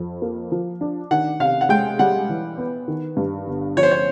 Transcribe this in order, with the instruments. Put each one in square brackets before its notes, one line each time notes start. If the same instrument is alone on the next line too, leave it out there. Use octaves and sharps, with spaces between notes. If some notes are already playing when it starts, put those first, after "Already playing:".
Already playing: [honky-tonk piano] F2
A#3
F3
D4
[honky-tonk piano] D#3 [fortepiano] F#5
[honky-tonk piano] C3 [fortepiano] F5
[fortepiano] F#5
[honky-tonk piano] G#3 [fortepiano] G5
[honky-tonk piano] G3 [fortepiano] F#5
[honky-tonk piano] E3
B3
D#3
G2
G1
[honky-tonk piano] F3 [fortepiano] C#5
[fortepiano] C5
C#5